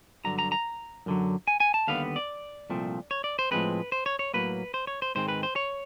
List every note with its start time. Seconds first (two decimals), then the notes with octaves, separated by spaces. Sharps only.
0.24 G2 D3 F#3 A#5
0.39 A#5
0.52 A#5
1.06 F#2 D3 F#3
1.48 G#5
1.60 G#5
1.74 A5
1.88 D#2 D3 G3 B3 F5
2.16 D5
2.70 C2 A#2 F3 A3 C4
3.11 C#5
3.24 D5
3.39 C5
3.51 A2 F3 G#3 C4 B4
3.92 C5
4.06 C#5
4.19 C#5
4.34 A2 F#3 A#3 B4
4.74 C5
4.87 C#5
5.02 C5
5.15 G#2 D#3 G#3 C4 C5
5.28 B4
5.43 C5
5.56 C#5